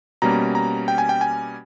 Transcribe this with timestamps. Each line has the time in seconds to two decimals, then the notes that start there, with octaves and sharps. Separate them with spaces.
0.22 B2 G3 A#3 C#4 A#5
0.55 A#5
0.88 G5
0.98 G#5
1.09 G5
1.21 G#5